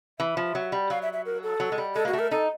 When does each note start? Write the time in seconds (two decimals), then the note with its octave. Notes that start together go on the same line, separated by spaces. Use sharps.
0.19 E3 E5
0.37 F3
0.55 F#3
0.72 G3
0.90 F#3 F5
1.02 E5
1.13 E5
1.26 A#4
1.43 A4
1.60 F#3
1.72 G#3
1.78 G3
1.95 G#3 A4
2.05 A#3 F#4
2.13 A3
2.19 A#4
2.31 D#4 A4